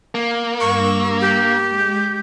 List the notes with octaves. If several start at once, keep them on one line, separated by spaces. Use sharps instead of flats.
A#3
G2 C#6 E6
G4
G#3